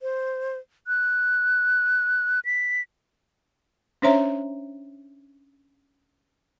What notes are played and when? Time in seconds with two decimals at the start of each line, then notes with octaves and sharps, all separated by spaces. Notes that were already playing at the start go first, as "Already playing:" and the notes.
0.01 C5
0.87 F#6
2.45 B6
4.02 C#4 D4 C5 C#5 E5 A#5